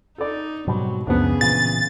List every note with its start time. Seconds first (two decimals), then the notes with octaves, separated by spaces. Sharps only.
0.18 D#4 A4 D5
0.67 G#2 B2 F#3 G3 C4
1.07 C#2 F#2 C#3 F3 B3 D4 G#4
1.41 A#2 E3 A6